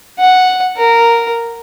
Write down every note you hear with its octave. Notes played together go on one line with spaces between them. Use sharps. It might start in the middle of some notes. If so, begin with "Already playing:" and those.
F#5
A#4